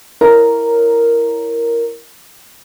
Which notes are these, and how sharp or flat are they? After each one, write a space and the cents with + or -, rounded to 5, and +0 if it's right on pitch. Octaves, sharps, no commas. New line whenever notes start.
E4 +0 A#4 +0 C#5 +0